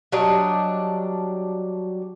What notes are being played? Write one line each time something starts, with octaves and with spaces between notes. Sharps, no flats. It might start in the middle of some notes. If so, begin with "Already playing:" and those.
F#3 G3 D4 D#5